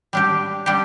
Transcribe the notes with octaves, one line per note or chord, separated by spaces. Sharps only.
G3 D4 G4
G3 D4 G4